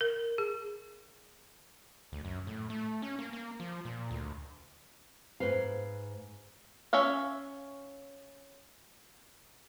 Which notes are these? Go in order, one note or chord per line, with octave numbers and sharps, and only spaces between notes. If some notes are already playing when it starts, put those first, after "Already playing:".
A#4
G#4
D2
F#2
A2
A3
C#4
A#3
A#3
F3
A#2
D2
G#2 C#3 B4 C5 F5
C#4 C#5 E5 F5